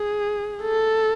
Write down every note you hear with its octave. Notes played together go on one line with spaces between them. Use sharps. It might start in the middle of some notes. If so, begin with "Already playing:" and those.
Already playing: G#4
A4